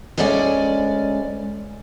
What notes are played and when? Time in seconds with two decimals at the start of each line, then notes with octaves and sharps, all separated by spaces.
0.17 D2 G#3 C#4 D5 E5 G#5